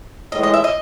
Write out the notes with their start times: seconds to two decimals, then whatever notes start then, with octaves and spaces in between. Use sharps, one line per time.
0.32 A2 E3 G#3 D#5
0.43 D#5
0.54 E5
0.64 D#5